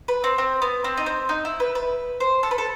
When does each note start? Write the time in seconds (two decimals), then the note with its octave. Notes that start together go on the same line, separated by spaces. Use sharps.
0.08 B4
0.24 C4
0.38 C4
0.62 B3
0.84 C4
0.97 D#4
1.06 C4
1.29 D#4
1.45 E4
1.60 B4
1.75 B4
2.20 C5
2.43 A4
2.51 B4
2.58 A4